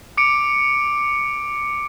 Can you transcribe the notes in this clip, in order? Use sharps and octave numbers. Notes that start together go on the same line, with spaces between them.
D6 C#7 D7